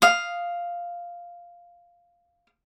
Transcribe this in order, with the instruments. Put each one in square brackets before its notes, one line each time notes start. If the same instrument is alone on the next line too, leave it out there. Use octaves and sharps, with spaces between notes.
[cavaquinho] F5 D#6